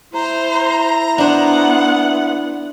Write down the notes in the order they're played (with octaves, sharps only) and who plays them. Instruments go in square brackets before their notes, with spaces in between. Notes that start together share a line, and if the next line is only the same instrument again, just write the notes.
[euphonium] E4 [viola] C5 [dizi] A#5
[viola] B3 F#5 [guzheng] D4 C5